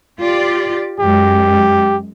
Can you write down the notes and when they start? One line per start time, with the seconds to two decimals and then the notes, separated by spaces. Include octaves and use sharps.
0.20 F4 G4 D5
1.00 F#2 G#3 G4